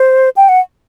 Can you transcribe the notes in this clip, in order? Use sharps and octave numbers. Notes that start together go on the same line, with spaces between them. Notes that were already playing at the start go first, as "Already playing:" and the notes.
Already playing: C5
G5
F#5